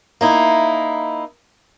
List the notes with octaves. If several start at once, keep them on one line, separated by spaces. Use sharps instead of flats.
A#3 D#4 E4